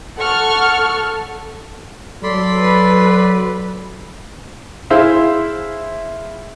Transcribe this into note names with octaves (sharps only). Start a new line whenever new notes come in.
A4 F#5 C#6 F6
F#3 A4 D5 B5 C6
B4
E4 G#4 C5 E5 F5